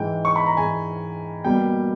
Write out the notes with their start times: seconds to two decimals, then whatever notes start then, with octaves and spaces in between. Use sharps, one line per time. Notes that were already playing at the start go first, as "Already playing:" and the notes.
Already playing: G#2 E3 G#3 G5
0.25 C#6
0.36 B5
0.46 A#5
0.57 G#2 E3 G#3 G#5
1.44 B2 G3 A#3 G5